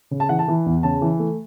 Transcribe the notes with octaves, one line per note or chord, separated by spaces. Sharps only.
C#3
A5
E3 F#5
A5
E3
E2
C#3 A5
E3
A3